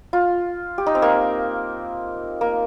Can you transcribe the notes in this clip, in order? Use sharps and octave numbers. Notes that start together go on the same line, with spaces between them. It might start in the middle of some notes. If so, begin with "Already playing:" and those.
F4
G4
D#4
C4
A#3
A#3